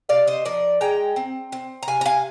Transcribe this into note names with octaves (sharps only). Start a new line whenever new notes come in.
C3 D5 F5
C5 D#5
F3 A#4 D5
G#3 G5 A#5
C4
C4
A#5
C3 F5 G#5
A#5
F5 G#5